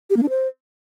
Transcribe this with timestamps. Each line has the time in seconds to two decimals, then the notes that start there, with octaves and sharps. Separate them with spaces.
0.10 G4
0.16 A#3
0.23 D4
0.29 C5